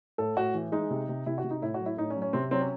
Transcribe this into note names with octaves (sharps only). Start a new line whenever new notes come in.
A2 A4
A2 F#4
E3
G#3 D#4
C3
C3
C3 E4
F#4
C3
D#4
A2 E4
F#4
F#3
E4
A2 D#4
C#4
F#3
C#4
C3 C4
F#3 C4
C#4